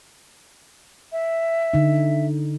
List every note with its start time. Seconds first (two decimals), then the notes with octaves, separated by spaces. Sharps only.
1.12 E5
1.74 D3 D#4